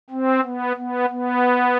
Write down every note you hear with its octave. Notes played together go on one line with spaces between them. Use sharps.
C4
B3
B3
B3